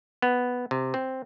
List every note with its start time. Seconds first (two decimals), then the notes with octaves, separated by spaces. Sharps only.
0.22 B3
0.71 C3
0.94 C4